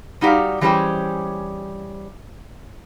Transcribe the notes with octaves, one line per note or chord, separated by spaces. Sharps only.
G3 D#4 F#4 G4 D5 F5
E3 G3 C#4 G#4 C5 G5